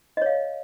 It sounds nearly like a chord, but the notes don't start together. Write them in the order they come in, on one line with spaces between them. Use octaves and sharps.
D#5 C#5 F5